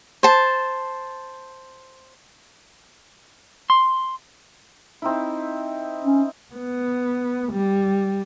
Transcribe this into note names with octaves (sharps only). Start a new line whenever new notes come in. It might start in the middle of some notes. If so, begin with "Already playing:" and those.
C5 A5
C6
C4 D#4 E4
C#4
B3
G3